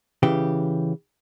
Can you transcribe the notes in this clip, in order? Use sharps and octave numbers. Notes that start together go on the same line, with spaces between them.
C#3 E3 G4